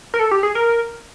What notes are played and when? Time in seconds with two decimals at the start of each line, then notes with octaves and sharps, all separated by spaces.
0.14 A#4
0.19 A4
0.31 G4
0.43 G#4
0.55 A#4